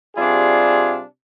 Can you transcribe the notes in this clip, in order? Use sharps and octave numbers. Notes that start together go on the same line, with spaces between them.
C3 G3 D4 F4 G#4